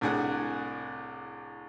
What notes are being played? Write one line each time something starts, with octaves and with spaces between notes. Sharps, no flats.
C2 A2 D4 G#4 F#5